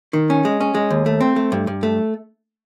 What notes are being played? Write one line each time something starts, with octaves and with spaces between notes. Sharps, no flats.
D#3
C#4
G#3
C#4
G#3
D#2
A3
C4
A3
G2
G2
A3